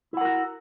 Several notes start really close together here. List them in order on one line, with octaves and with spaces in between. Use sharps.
E4 F#5 A#4 F#4